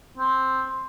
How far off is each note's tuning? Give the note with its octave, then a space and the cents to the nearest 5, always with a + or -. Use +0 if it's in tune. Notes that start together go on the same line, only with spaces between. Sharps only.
C4 +5